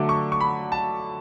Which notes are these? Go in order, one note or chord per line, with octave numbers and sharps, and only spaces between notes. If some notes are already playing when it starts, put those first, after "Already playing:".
Already playing: D3 F#3 A3 D6
C#6
C#6
B5
A5